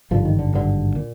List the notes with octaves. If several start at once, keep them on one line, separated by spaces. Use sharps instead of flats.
G#1 G2 D3 F3
D#3
D3
G#1 G2 D3
A#2